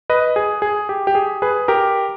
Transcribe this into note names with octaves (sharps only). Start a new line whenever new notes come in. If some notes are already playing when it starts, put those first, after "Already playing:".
B4 D#5
G#4
G#4
G4
G4
G#4
G#4 B4
G4 A#4